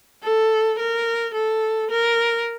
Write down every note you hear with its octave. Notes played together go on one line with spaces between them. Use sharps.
A4
A#4
A4
A#4